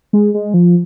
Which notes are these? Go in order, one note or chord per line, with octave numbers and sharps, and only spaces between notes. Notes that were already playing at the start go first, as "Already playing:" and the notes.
G#3
G#3
F3